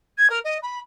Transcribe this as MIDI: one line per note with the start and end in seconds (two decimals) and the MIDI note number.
0.18 0.27 92
0.30 0.39 70
0.44 0.58 75
0.62 0.79 83